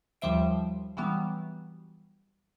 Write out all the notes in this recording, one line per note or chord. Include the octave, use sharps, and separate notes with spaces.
D#2 F3 G3 C5 E5 D7
E3 F#3 G3 B3